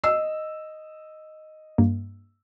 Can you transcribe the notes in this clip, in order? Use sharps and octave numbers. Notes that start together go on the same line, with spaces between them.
D#5 E6 C7
G2 A#3